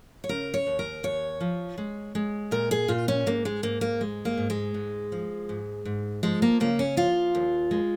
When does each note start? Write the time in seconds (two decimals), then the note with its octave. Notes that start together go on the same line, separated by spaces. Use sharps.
0.24 C#5
0.29 C#3 A#4
0.54 C#5
0.67 D#2
0.79 A#4
1.03 D#2 C#5
1.41 F3
1.78 G#3
2.15 G#3
2.51 A#2 A#4
2.71 G#4
2.88 A#2 F4
3.08 C#4
3.26 G#2 A#3
3.45 G#3
3.63 G#2 A#3
3.81 A#3
4.01 G#3
4.25 A#3
4.37 G#2
4.50 G#3
4.74 G#2
5.12 F3
5.49 G#2
5.85 G#2
6.23 F3 G#3
6.42 A#3
6.60 C#3 A#3
6.79 C#4
6.97 F3 F4
7.35 D#2
7.71 G#3